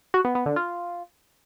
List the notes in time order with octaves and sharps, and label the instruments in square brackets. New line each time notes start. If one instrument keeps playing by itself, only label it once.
[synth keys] F#4
B3
B3
D3
F4